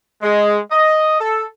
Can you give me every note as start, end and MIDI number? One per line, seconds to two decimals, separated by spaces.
0.22 0.59 56
0.72 1.18 75
1.20 1.45 69